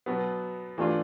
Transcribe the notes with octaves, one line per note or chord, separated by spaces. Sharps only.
B2 F#3 B3
E3 A3 D4 F4